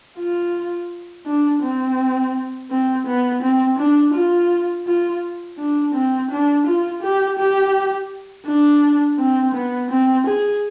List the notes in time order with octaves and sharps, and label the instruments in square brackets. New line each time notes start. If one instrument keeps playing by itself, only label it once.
[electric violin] F4
D4
C4
C4
B3
C4
D4
F4
F4
D4
C4
D4
F4
G4
G4
D4
C4
B3
C4
G#4